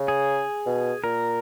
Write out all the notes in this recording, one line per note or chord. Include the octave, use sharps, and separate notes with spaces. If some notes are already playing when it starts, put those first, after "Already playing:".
Already playing: C#3
G#4
B2
A#2 A#4